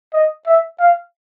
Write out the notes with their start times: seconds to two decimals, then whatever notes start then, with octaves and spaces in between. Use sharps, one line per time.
0.13 D#5
0.46 E5
0.79 F5